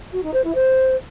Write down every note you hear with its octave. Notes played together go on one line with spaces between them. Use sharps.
F#4
D#4
C5
E4
C5